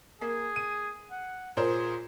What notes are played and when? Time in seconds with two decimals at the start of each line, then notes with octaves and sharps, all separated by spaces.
0.21 A#3 G#4
0.56 D#7
1.11 F#5
1.57 A#2 G#4 A#4 C5